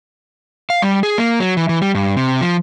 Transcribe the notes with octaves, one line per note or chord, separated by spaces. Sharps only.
F5
G3
G#4
A#3
F#3
E3
E3
G3
G2
C3
F3